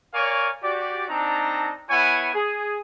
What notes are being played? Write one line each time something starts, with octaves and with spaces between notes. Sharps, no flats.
A#4 C#5 D5 F5 G#5 C#6
F#4 G4 D5
C4 D4 D#4 A5 A#5
B3 E4 C#5 F#5 G#5
G#4